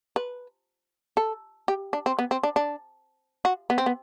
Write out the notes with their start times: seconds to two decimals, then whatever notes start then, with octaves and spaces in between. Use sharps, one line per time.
0.16 B4
1.17 A4
1.68 G4
1.93 D4
2.06 C4
2.19 B3
2.31 C4
2.43 D4
2.56 D4
3.45 F#4
3.70 B3
3.78 C4
3.86 B3